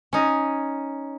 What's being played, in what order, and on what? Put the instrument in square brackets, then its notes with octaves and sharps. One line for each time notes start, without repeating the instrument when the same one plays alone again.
[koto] C#4 D#4